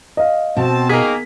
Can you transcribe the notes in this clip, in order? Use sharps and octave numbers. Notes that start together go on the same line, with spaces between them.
D#5 F5
B2 C4 A5
D#3 A#3 G#4 A#4 B6